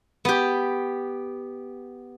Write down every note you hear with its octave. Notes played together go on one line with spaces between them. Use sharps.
B3 G4